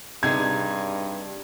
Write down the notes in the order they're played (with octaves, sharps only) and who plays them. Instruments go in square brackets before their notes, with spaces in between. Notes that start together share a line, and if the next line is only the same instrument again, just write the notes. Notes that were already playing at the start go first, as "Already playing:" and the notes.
[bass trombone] G2 [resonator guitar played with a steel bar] C3 D#4 G#4 [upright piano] G#6